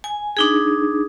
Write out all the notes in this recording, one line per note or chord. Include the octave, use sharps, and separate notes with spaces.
G#5
D4 D#4 G#4